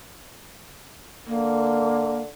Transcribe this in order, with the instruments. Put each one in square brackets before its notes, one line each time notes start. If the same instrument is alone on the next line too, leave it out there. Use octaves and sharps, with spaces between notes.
[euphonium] D3 [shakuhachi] A#3